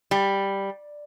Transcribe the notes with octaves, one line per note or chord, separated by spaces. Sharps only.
G3